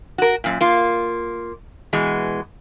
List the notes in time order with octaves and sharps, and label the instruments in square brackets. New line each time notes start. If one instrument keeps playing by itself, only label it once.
[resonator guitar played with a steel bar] F#4 A#4
F#2 A#2
A#3 F4
B2 E3 G#3